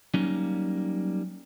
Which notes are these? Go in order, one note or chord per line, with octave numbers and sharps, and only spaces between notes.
F#3 G3 A#3 C#4 D#4